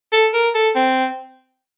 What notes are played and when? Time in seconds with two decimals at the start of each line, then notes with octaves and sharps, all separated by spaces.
0.12 A4
0.34 A#4
0.55 A4
0.76 C4